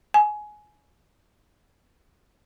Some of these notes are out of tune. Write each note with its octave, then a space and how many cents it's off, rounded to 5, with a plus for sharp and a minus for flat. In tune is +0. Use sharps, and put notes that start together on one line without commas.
G#5 +20